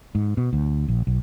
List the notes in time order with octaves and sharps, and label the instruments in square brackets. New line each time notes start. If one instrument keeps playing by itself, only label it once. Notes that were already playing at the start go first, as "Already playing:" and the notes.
[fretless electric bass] G#2
B2
D2
A#1
B1